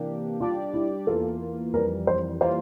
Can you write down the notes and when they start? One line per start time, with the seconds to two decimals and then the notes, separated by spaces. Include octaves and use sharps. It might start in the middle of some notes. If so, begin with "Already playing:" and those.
Already playing: C3 E3 A#3 D4 G4
0.40 G3 D4 F4 G4 D5
0.74 E4
1.07 E2 E3 A#3 F4 A4
1.73 F2 E3 G3 A#4
2.07 C5
2.41 E3 G3 A#3 F4 C5